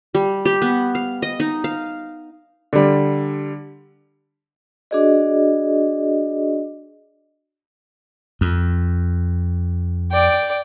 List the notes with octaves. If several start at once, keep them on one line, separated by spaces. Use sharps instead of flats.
G3
G4
B3
F5
D#5
D#4
F5
D3 G3
D4 F#4 G#4 D5 D#5
F2
D5 G5